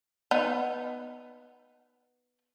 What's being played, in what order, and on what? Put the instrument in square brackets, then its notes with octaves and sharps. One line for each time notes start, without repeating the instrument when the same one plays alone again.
[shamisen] B3 D#4